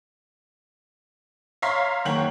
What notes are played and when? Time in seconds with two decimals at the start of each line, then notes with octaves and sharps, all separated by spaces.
1.62 C#5 E5 F5 A#5 C6 B6
2.05 F#1 D#3 C#5 F#5 G5 F#7